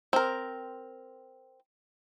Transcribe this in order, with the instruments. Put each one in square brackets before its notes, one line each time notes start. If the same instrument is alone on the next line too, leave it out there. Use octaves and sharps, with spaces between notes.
[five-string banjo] C4 A#4